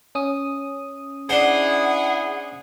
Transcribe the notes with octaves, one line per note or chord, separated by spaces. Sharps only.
C#4 D#6
D4 E4 G#4 C5 F#5